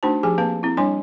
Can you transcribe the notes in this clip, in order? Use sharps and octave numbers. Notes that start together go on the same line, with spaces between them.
A3 D4 D#4 F#4 C5 A5
F3 G4 G#4 G#5
A#3 C4 B4 F5 A5
C4 E4
G3 D4 C#5 G#5 C6